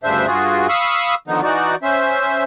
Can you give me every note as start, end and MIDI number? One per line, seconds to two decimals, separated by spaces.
0.03 0.27 38
0.03 0.27 43
0.03 0.27 49
0.03 0.27 62
0.03 0.27 72
0.03 0.27 76
0.27 0.67 43
0.27 0.67 65
0.27 0.67 66
0.27 0.67 68
0.69 1.15 77
0.69 1.15 83
0.69 1.15 85
0.69 1.15 87
0.69 1.15 88
1.28 1.41 50
1.28 1.41 51
1.28 1.41 53
1.28 1.41 59
1.28 1.41 63
1.42 1.75 52
1.42 1.75 63
1.42 1.75 66
1.42 1.75 74
1.83 2.44 61
1.83 2.44 72
1.83 2.44 76